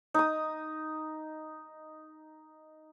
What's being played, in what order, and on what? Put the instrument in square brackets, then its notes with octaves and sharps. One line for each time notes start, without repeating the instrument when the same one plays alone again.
[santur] D#4 D#6